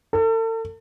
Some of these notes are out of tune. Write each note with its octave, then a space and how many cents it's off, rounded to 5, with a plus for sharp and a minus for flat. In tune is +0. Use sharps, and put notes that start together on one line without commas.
A4 +40